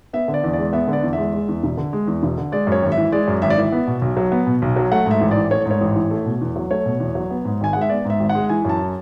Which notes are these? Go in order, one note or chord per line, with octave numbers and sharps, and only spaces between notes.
B3 E5
D3
D5
E2
G#3 D5
B3 E5
D3
D5
E2
G#3 E5
G#3
E2
E1
D3
G#3
E2
E1
D3
G#3 D5
F#2 C#5
G#1
E5
E3
G#3 D5
F#2
G#1 E5
D5
E3 E5
B3
B2
B1
F#3
B3
B2
B1
F#3
A3 F#5
G#2 E5
A1
D5
E3
A3 C#5
G#2
C#5
A1
E3
A3
B2
E2
F#3
A3 C#5
B2
E2
F#3
B3
G#2
G#1 G#5
G#3 F#5
E5
B3 D5
G#2 E5
G#1
F#5
G#3
E3 G#5
F#2 A5